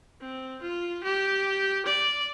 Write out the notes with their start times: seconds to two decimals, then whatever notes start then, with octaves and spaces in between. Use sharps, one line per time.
0.21 C4
0.62 F4
1.04 G4
1.86 D5